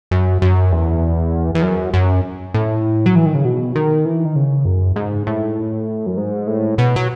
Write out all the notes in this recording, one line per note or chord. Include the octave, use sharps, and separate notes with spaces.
F#2
F#2
E2
E2
F#2
F#2
A2
F#3
E3
D#3
C#3
B2
D#3
E3
D#3
C#3
F#2
G#2
A2
F#2
G#2
A2
B2
F#3